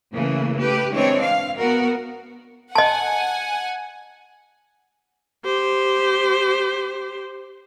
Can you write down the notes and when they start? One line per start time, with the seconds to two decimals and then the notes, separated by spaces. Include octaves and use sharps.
0.13 C#3 E3 A3 A#3
0.58 A3 G4 B4
0.93 E3 G#3 C4 D4 C#5
1.22 F5
1.58 B3 F#4 A#4
2.75 D#5 F#5 G#5 A5
5.45 G4 C5